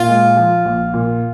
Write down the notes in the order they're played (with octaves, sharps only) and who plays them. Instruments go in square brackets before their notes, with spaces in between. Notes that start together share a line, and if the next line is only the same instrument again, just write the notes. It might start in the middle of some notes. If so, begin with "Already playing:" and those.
Already playing: [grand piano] A#2 [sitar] F4
[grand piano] G#3
F3
A#1
A#2